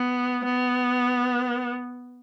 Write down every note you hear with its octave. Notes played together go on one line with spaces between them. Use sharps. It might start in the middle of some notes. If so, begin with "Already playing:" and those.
Already playing: B3
B3